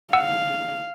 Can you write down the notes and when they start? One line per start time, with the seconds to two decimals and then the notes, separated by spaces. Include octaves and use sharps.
0.13 F5 F#5 E6